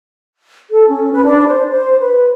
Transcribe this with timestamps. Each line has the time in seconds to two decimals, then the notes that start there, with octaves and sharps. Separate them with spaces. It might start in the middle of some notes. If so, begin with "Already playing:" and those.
0.70 A4
0.88 C#4
1.12 B4
1.25 D4
1.47 C5
1.71 C5
2.01 B4